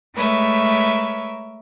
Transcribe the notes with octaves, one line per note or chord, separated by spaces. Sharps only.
G#3 A3 A#4 B4 C#5 E5